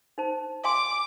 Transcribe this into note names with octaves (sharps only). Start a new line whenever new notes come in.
D#4 C5 A5
F5 G#5 C6 D6